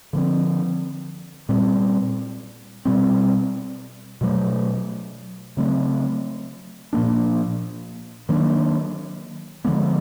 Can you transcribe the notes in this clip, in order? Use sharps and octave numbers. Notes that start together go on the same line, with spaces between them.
D3 F3 G#3 C4
A#2 G3 C4
B2 G3 C4
B2 F#3 A3
C#3 F#3 A3 C4
A#2 F3 A#3 D4
D#3 F#3 A#3 D4
D3 F3 G#3 B3